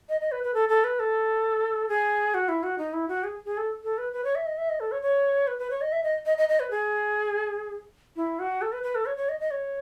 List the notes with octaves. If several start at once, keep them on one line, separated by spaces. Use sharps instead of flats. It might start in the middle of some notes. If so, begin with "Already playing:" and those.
D#5
D#5
B4
B4
A4
A4
B4
A4
G#4
F#4
E4
F#4
D#4
E4
F#4
G#4
G#4
A4
A4
B4
B4
C#5
E5
D#5
E5
D#5
A4
C#5
C#5
B4
B4
C#5
D#5
E5
D#5
D#5
D#5
D#5
B4
G#4
E4
F#4
A4
B4
B4
A4
C#5
C#5
D#5
D#5
C#5